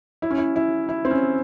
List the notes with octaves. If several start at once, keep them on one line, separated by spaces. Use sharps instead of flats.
E4
C#4
E4
E4
E4
C4
C#4